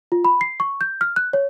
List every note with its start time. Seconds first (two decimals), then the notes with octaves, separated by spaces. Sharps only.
0.12 F4
0.25 B5
0.41 C7
0.60 C#6
0.81 G6
1.01 F6
1.16 F#6
1.33 C#5